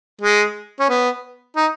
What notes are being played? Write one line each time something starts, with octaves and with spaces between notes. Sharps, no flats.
G#3
C#4
B3
D#4